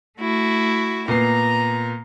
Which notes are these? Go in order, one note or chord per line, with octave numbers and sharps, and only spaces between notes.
A3 E4 F#4
A#2 B3 A#5 C7